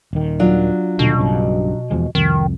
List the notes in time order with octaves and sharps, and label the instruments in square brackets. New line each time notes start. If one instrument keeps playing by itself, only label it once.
[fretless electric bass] D#1 D#3
[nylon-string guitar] F#3 D4 F4
[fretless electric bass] D#1 D3 [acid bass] B2
[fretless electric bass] B1 G2 C#3
E2 F3 G#3
[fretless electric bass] C2 F2 [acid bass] D#3